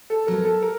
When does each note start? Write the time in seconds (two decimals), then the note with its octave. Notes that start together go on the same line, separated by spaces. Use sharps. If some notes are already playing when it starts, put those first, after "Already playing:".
0.10 A4
0.27 F#3 B3 A#4
0.45 A4
0.63 A#4